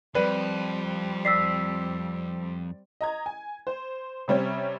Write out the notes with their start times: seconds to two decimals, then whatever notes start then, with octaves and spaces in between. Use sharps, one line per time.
0.15 F2 G3 C4 B4 D5
1.25 D5 E6 B6 C7
3.01 D#5 A#5 G#6
3.26 G#5
3.67 C5
4.28 C3 G3 C4 C#4